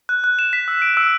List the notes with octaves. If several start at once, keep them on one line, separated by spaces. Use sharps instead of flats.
F#6
F#6
E7
B6
E6
D7
E6